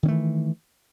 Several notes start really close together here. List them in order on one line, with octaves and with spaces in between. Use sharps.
D#3 C#4 A3 E3